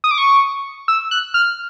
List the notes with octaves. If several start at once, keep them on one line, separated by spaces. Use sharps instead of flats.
D#6
D6
C#6
E6
F#6
F6